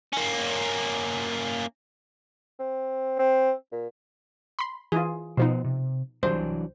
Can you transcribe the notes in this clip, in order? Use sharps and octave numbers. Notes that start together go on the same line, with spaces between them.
A#3 C#4
C4
C4
A#2
B5 C6
E3 F4 G#4
B2 F3 B3 D#4 C5
C3
C2 E3 F#3 D4 C5